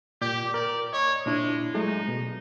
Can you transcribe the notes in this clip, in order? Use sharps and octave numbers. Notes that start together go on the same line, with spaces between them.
A#2 G4 D5 G6
A#4 D5
C#5 D#5
A#2 G#3 D4 E4
F#3 G#3 A3 D#4
B2